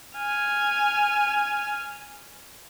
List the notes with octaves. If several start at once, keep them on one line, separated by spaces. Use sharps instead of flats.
G#5 F6